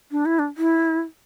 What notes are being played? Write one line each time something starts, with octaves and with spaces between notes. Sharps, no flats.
D4
E4
D4
E4